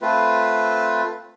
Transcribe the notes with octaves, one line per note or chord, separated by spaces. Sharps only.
A3 C4 F4 B4